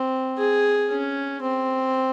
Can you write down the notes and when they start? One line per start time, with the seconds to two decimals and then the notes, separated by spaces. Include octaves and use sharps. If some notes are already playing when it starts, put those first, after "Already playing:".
Already playing: C4
0.38 G#4
0.90 C#4
1.42 C4